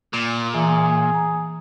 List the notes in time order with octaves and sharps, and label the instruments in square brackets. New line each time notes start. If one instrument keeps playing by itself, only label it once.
[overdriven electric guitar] A#2
[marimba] E3 A#5 [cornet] G#4
[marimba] A#5